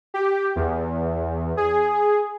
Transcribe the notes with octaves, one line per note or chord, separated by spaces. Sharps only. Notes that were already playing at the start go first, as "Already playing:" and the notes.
G4
E2
G#4